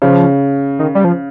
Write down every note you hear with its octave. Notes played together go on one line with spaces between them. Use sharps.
C#3 F3
D#3
G3
F3